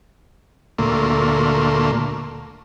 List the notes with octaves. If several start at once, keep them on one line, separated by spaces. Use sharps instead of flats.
D2 A#2 A3 A#3 C6